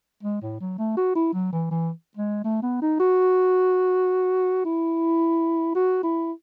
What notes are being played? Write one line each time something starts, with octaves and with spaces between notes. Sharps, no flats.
G#3
A2
F#3
A3
F#4
E4
F#3
E3
E3
G#3
A3
B3
D#4
F#4
E4
F#4
E4